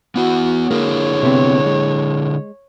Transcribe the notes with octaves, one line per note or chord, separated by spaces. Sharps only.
B3 E4 F#4 F#5
D3 A#3 E4 G#4 C#5
C3 B3 C4
G#3